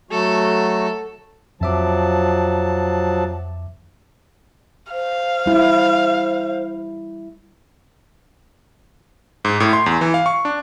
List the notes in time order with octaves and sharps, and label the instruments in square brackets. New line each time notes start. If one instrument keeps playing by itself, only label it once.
[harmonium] F#3 A3 F#4 [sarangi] A4
[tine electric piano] F2 E5 D6 [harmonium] F3 F#3 A5
[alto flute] C5 [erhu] F5
[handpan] G3 E4
[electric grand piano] G#2
A2
C6
E2
E3
F5
C#6
D4